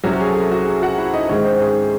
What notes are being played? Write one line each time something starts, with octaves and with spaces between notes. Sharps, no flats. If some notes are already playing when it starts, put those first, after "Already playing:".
C2 C3 F#3 C#4 F#4
G#4
A4
G#4
F#4
G#4
F#4 F#5
E4 E5
D#4 D#5
G#2 D#3 G#3 C4 C#4 C#5
C4 C5
G#4